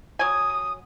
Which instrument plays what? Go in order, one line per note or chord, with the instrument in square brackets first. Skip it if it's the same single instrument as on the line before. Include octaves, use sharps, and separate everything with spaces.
[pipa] F#3 G#5 [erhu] D#6